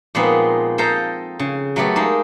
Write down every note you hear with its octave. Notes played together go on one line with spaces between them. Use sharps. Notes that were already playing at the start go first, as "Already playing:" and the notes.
A#2 F3 G#3 B3 C4 D#4
A4 C5 D#5 F5 G5 A#5
C#3
F#3 A3 B3 G4 A4
G#3 A#3 D#4